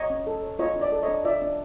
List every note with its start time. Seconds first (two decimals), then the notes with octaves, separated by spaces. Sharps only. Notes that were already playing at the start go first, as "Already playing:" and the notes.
Already playing: C#5 D#5
0.10 C#4
0.27 A4
0.43 C#5
0.59 F4 C#5 D#5
0.76 D4
0.81 D5
0.92 A4
1.03 C#5 D#5
1.08 D4
1.25 F4 D5 E5
1.42 D4